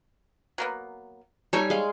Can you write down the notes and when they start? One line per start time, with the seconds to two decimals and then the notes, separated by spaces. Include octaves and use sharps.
0.58 F#3 A#3 B3
1.53 G3 D#4 A4 C#5 G#5
1.70 G#3 F5